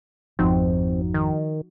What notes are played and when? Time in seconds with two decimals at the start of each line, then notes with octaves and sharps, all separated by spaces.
0.39 G#1 F2 F3 C4 D#4 F#4
1.14 D#3